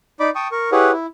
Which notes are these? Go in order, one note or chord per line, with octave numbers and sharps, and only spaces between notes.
D#4 D5 B5 D6
G5 A5 C#6 D#6
A#4 C#6
E4 G4 G#4 B4 C#5 F#5
E4